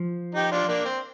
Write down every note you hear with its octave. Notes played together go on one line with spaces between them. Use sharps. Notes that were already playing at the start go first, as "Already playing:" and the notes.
Already playing: F3
D#4 G4
D4 F4
A#3 D4
C4